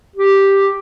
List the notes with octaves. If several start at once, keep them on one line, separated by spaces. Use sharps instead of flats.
G4